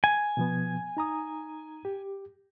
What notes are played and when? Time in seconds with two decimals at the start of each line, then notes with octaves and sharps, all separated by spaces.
0.04 G#5
0.37 B2 F3 B3
0.97 D#4 A#5 D#6
1.85 G4